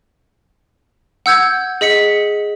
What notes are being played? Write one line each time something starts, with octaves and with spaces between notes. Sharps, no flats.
F#5 E6 G6 G#6
G#4 D#5 B6 C#7